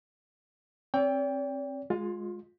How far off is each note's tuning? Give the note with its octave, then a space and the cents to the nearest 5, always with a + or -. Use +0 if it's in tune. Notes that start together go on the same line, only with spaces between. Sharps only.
C4 +25 D5 -45 G5 +15
G#3 +0 F4 +25